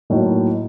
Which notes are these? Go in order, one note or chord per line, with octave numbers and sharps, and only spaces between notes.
A2 F#3 A#3 D#4